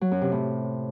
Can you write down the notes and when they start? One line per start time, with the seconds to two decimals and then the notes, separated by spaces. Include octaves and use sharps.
0.01 F#3
0.11 F#2
0.22 C3
0.32 A2